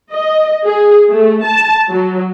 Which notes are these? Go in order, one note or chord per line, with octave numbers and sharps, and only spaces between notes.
D#5
G#4
A3
A5
F#3